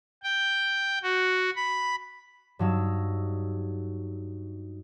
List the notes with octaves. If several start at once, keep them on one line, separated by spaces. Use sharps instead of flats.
G5
F#4
B5
G2 F#3 D#4 E6